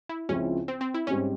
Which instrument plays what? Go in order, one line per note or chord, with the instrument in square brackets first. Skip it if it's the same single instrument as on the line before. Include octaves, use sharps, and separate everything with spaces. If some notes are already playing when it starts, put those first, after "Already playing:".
[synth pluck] E4
[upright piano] C#2 C#3 F3 C4 E4 [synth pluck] C#4
[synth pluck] C4
C4
E4
[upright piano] G#2 G3 C4 [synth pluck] C#4